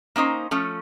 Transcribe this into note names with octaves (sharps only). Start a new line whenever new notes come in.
A#3 C#4 D#4 C5
F3 A3 C#4